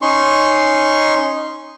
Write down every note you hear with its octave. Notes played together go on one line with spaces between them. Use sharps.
C#4 D#4 C6 C#6